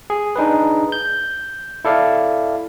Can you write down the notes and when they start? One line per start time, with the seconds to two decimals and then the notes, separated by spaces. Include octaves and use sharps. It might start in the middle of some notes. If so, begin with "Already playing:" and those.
0.10 G#4
0.36 D4 D#4 G#4 B4
0.92 G6
1.85 E4 A4 D5 F5